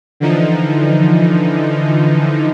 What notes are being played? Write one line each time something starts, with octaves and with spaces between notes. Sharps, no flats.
D3 E3 F3 D#4